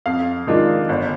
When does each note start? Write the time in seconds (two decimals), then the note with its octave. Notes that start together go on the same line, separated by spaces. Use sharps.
0.06 F2 F5
0.47 D#3 G#3 D4 F4
0.89 G1